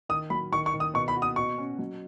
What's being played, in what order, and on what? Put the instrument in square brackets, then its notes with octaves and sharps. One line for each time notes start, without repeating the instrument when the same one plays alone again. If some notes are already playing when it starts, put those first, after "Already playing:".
[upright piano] D#3 [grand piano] D#6
[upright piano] F#3 [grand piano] B5
[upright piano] D#3 [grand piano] C#6
[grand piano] C#6
[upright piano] D#3
[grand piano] D#6
[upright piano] B2 [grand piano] C#6
[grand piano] B5
[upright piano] F#4
[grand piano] D#6
[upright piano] B2 [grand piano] C#6
[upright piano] C#4
F#3